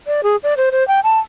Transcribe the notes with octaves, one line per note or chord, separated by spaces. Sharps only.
D5
G#4
D5
C5
C5
G5
A5